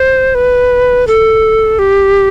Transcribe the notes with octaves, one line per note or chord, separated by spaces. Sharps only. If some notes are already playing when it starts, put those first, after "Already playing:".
Already playing: C5
B4
A4
G4